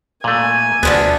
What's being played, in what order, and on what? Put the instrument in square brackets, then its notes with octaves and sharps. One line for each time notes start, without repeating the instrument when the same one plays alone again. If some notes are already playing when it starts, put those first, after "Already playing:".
[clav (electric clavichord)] A#2 A3 [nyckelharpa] G#5
[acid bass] D2 [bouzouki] D3 F3 A4 [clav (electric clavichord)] B3